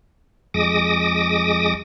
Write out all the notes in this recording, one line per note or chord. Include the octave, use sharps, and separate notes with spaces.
F2 G#3 D6 D#6 A#6